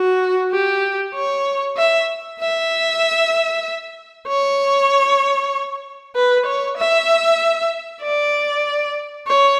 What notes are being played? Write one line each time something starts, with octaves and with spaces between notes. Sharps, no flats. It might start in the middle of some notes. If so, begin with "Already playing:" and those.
Already playing: F#4
G4
C#5
E5
E5
C#5
B4
C#5
E5
D5
C#5